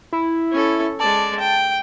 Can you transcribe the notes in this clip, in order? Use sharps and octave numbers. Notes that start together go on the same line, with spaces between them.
E4
C#4 A4
G#3 D5 A5
G5